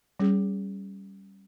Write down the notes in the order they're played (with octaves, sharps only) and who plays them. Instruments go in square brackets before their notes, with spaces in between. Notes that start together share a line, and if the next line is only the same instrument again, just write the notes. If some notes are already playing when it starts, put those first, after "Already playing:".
[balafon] G3 C#4 G#4